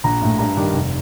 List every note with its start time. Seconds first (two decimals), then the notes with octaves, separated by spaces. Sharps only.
0.04 A#1 A#5
0.22 A2 A3
0.39 G2 A#5
0.57 D#3 G3 D4
0.74 F1